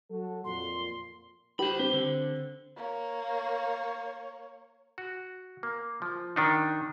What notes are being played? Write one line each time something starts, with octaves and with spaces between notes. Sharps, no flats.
F#3 F#4 A4
F2 A#2 C6
G4 C5 B5
C4 G4
D3
A#3 C#5
F#4
A#3
F3
D#3 D4 D#4